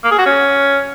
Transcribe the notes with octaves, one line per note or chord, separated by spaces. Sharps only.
A#3
G#4
F#4
C#4